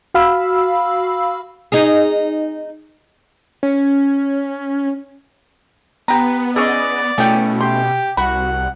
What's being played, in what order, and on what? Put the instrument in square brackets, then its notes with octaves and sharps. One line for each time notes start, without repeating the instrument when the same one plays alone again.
[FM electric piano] F#4 F5 B5 E6
[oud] D#4 G#4
[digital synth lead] C#4
[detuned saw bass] B3 [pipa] G4 A#5 [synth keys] B4
[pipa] C#4 E4 [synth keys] G#4 D#5 [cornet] D5
[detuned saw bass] B2 [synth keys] A3 C#4 E4 [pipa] G#4 G5
[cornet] G4 [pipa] C6
[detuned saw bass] C2 [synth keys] F#4 [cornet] F#5 [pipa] B5